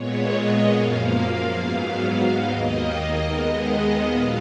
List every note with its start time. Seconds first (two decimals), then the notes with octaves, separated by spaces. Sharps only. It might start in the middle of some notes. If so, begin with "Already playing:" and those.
Already playing: A#2 G#3 B3 C#5
0.29 D#5
0.71 F#2 F3 A#3 F5
1.55 G#2 F#3 B3 F5
2.39 D#2 D#3 A#3 D#5
3.24 D#2 D#3 G#3 B3
4.08 A#2 F#3 B3 F5